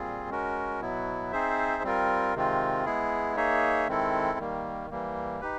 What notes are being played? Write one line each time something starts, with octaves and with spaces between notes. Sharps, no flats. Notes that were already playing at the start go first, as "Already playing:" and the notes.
Already playing: A#2 G3 C4 F4 G#4
G#3 C#4 F#4 A#4
B2 F#3 B3 E4
C4 D#4 G#4 C5 E5
G3 C4 F4 A#4
C3 D#3 G#3 C4 F4
G#3 B3 E4 G#4
A#3 D#4 G#4 C#5 E5
D#3 G#3 C4 E4 A4
D#3 G3 A#3
E3 G3 A#3
D#4 G4 B4